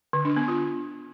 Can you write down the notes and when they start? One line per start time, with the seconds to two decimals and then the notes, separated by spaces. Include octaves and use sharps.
0.13 D3
0.25 D4
0.36 B3
0.48 F4